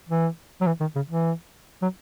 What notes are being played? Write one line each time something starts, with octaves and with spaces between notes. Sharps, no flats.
E3
F#3
E3
D#3
C#3
E3
F#3